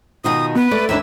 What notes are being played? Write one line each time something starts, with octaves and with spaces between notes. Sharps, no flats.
B2 D#3 F4 D#6
B3 B4
A3 D5
D#2 E3 D4 E5 E6